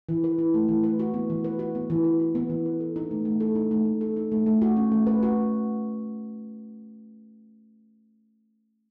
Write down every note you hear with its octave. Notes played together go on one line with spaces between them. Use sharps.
E3
B4
E4
A3
E3
B4
F#4
B3
E3
B4
F#4
B3
E3
B4
F#4
B3
E3
B4
A4
D#4
A3
A3
A4
D#4
A3
A3
A4
D#4
A3
A3
F#4
C#4
A3
B4
F#4